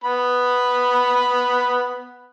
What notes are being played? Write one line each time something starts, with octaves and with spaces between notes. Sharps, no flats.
B3 B5